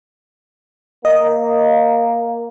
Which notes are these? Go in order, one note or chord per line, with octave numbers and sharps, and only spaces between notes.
A#3 D#5